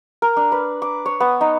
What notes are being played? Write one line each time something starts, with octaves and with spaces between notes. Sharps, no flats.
A#4
D4
B4
D6
C#5
B3
D#4